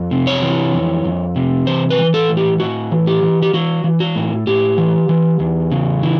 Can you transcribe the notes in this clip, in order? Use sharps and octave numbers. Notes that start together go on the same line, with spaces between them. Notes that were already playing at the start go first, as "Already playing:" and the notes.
Already playing: F2
C3
C#5
E3
F2
F2
C3
E3 C5
B4
E3
A4
A2
G4
A2 F#4
E3
G4
E3
G4
E3 F#4
E3
F#4
A2
A2 G4
E3
E3
E2
C#3
E3